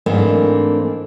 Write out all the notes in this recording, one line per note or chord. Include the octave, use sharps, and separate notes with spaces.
G#2 E3 A3 A#3 C4 D4